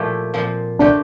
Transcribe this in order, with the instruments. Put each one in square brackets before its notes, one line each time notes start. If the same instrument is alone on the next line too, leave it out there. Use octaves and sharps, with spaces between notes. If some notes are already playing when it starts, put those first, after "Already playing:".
Already playing: [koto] A#2 F3 A3 E4 G4
A#2 F3 C4
[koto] D3 A3 C4 G4 [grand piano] D4